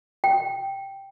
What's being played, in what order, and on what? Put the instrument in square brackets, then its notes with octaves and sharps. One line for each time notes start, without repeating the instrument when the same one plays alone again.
[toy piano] G5